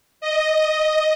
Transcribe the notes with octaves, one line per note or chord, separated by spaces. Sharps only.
D#5